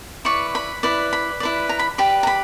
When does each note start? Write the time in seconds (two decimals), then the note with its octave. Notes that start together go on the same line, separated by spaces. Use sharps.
0.25 E4 B4 D5 C#6
0.55 B5
0.83 E4 B4 D5
1.13 B5
1.40 E4 B4 D5
1.69 A#5
1.79 B5
1.98 G4 B4 D5 B5
2.23 A#5
2.27 B5